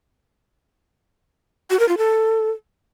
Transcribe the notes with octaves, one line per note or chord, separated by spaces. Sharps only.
F#4
A#4
F4
A4